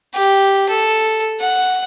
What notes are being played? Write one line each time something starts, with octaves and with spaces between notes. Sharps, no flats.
G4
A4
F#5